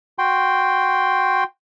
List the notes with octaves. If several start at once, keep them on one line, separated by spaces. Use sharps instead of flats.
F#4 G5 C6